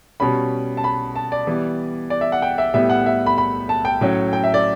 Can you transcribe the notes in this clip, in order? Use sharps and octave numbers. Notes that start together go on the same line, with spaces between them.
B2 G3 C#4 B5
A5
B5
A5
D5
E3 G3 B3
D5
E5
F#5
G5
E5
A2 G3 B3 E5
F#5
E5
B5
B5
A5
G5
A2 F#3 C#4
G5
E5
D5